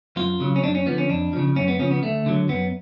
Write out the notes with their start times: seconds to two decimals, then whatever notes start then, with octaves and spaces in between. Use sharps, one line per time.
0.16 F#2 F4
0.40 C#3 F#3
0.56 C#4
0.63 F#2 D4
0.75 C#4
0.86 D3 F3 B3
0.98 C#4
1.09 F2 D4
1.33 C#3 F3
1.56 F#2 C#4
1.68 B3
1.79 C#3 F3 C#4
1.91 B3
2.03 D2 A3
2.26 D3 F#3
2.49 F#2 B3